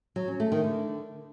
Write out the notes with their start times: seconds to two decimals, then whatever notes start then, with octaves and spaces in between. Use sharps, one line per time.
0.16 F#3
0.28 C#4
0.40 A3
0.52 D#3
0.64 D3